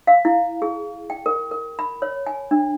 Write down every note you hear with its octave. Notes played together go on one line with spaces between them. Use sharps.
F5
E4
G#4
G5
A#4
A#4
B5
C#5
G#5
D4